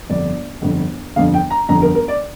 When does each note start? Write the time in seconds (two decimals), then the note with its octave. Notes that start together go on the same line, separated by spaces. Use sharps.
0.09 G1 F2 D3 D5
0.62 G1 F2 D3
1.16 G1 F2 D3 F5
1.34 G5
1.50 A#5
1.69 G1 F2 D3 A#5
1.82 A#4
1.95 A#4
2.08 D5